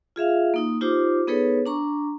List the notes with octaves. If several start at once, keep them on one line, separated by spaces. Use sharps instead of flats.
F4 G#4 E5 F5
A#3 D#4 D#6
D#4 F4 G4 C5 D6
B3 D#4 G#4 A4 B4 C#5
D4 A#5 C#6